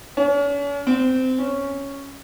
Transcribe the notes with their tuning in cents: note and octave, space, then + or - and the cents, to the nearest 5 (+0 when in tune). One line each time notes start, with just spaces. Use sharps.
C#4 +40
C4 -20
C#4 +0